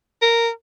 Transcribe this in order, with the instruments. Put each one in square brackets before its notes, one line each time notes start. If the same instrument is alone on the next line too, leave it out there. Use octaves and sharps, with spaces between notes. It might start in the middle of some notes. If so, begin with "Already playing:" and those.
[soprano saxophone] A#4